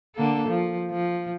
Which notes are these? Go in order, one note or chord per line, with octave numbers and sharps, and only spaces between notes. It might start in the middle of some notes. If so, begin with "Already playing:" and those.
D3 A#3 A4
F3
F3